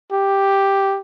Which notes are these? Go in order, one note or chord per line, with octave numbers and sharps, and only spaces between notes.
G4